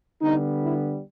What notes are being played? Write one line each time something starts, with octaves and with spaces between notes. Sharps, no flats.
D3 G3 B3 D#4
E4